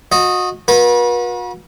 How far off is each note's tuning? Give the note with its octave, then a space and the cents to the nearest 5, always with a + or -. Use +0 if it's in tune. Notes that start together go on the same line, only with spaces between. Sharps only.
F#4 -30 D#5 +0
F#4 -40 B4 -40